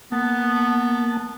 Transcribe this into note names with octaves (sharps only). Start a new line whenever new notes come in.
A#3 B3 A5